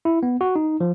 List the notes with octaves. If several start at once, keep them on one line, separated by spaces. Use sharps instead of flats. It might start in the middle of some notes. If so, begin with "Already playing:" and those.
E4
B3
F#4
D#4
F3